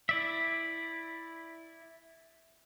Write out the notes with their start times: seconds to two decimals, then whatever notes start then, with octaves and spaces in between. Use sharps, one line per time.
0.09 E4 D5 E5